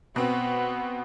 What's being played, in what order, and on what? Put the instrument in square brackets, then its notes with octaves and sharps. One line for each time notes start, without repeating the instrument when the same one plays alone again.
[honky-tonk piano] B2 C4 [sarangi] B3